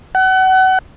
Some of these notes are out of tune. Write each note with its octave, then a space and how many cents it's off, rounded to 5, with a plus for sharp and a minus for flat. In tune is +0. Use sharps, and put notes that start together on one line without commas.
F#5 +30